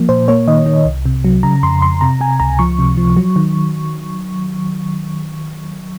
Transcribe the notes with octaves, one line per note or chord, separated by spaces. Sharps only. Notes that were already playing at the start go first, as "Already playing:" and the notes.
Already playing: F3 A#3
A#2 C5
A#3 C#5
D#3 D#5
D#3
C2
C3
F#3
C#3 A#5
F2 C6
F2 C6
C3 A#5
C3 G#5
C#2 A#5
F3 C#6
C3
F3
F#3
D#3